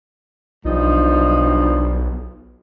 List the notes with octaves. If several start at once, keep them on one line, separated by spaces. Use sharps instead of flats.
B1 G2 F3 D#4